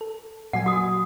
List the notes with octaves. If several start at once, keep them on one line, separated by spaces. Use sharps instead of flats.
A4
A#2 F#3 F#5 G#5
F#4 D#6